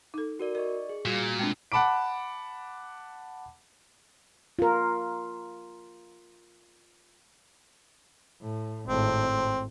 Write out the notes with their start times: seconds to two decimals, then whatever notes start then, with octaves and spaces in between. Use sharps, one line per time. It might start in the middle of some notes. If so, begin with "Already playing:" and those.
0.14 D#4 A4
0.39 F#4 A#4 D5
0.55 A#4 D5 D#5 C#6
0.89 G#4
1.05 A#2 G3 F#4 G#6 A#6
1.39 G#3 C4 D4
1.72 F#5 A5 B5 D6 D7
4.59 F4 A#4
8.42 A2
8.87 G#1 A2 C4